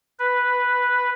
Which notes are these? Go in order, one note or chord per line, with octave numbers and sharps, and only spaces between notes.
B4